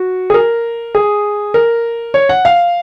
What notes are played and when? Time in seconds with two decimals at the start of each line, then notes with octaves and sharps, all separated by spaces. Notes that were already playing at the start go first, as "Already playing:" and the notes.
Already playing: F#4
0.30 G#4
0.34 A#4
0.95 G#4
1.54 A#4
2.14 C#5
2.29 F#5
2.45 F5